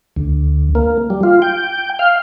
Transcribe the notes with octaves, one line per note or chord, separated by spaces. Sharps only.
D2
A#3
G3
F4
G5
F5